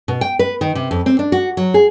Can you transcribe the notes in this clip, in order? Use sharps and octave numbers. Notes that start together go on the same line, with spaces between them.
B2
G5
B4
D#3
C3
F2
C4
D4
F#4
F#3
G#4